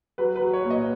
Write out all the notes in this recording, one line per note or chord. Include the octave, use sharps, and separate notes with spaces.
F#3 B4
B4
F#3
C#5
A#2
D#5